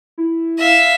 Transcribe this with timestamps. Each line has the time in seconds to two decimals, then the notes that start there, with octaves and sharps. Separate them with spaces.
0.18 E4
0.59 E5 F5